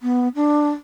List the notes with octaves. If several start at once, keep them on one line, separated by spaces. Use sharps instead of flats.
B3
D4